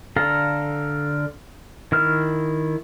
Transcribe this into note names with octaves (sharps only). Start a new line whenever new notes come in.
D3 A4 F5 A#5
D#3 E4 F6